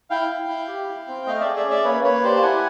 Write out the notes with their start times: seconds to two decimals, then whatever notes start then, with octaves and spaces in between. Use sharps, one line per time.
0.10 E4 F5 G5
0.29 E4
0.48 E4
0.68 G4
0.88 E4
1.07 C4
1.26 A3 D#5 F5
1.41 G#4 D5 E5
1.56 D5 E5
1.65 C#4
1.70 D5 E5
1.84 A#3 B4 C#5
2.04 A#3 B4 C#5
2.24 G4 C5 D5
2.36 A5
2.42 E4 F#5 G#5